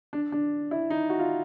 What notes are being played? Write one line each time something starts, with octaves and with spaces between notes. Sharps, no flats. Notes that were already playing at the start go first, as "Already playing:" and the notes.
D4
D4
E4
D#4
F#4
F4